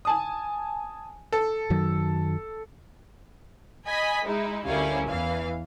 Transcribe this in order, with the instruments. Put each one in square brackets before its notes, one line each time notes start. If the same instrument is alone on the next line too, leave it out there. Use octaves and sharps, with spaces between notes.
[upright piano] G#5 A5 D#6
A4
[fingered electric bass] F#2 D#3 F#3
[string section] D#5 G#5 B5 B6
G#3 D#4 E4
D2 G3 C#4 E4 A#4 F5
E2 E3 F5